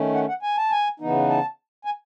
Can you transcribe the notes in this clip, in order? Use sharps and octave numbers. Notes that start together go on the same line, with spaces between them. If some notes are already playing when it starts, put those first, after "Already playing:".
Already playing: D#3 A3 C#4
F#5
F#5
G#5
A5
G#5
C#3 E3 B3 D#4
A5
G#5